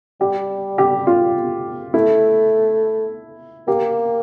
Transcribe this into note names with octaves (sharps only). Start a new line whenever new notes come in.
G3 G4
G4
F4
A3 E4
A#3 G4